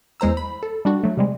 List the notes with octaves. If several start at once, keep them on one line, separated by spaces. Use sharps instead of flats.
E2 G#3 C5 A#5 E6
B5
A4
G3 D4 F#4
F#3 A3
C3 G3 G#3